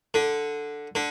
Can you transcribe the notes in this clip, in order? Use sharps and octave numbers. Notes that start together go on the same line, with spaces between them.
D3
D3